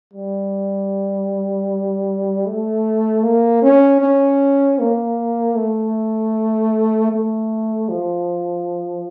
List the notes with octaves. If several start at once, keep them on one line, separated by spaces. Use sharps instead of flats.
G3
A3
A#3
C#4
C#4
A#3
A3
A3
F3